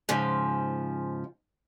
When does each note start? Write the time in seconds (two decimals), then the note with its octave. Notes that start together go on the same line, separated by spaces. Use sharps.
0.09 G#2 C#3 F3